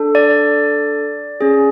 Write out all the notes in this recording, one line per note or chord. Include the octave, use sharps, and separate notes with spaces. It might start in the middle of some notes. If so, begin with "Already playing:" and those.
Already playing: D4 A4
D5
C#4 G#4